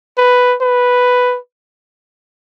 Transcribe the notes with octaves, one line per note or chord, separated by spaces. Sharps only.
B4
B4